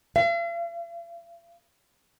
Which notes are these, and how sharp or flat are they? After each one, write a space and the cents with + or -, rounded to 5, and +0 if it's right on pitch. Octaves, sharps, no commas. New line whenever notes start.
F5 -45